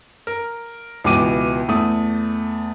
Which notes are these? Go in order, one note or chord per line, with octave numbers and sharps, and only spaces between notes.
A#4
C#2 B2 E3 D6 D#7
E2 A3 D#6